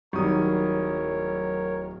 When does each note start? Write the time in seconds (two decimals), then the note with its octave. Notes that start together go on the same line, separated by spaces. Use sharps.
0.13 D1 D#3 F#3 G3 A#4 C#5 C#6 D#6